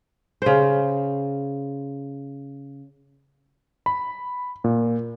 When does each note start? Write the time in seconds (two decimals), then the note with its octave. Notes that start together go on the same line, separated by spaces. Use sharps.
0.42 C#3 C5
3.86 B5
4.64 A#2